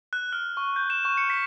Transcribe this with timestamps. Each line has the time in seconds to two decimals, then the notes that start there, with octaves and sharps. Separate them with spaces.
0.13 F#6
0.33 F6
0.57 C#6
0.76 G6
0.90 E7
1.05 C#6
1.17 C#7
1.30 B6